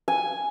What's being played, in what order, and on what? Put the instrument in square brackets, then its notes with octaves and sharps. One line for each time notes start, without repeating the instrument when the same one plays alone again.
[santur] G#5